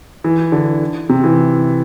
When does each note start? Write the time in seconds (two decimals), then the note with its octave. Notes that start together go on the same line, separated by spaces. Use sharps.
0.24 E3
0.52 D3
1.09 C3
1.24 E3